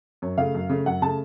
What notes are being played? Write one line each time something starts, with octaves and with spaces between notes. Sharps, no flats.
F#2 C#5
C#3 A3 F5
F#2
C#3 A3
F#2 F#5
C#3 A3 A5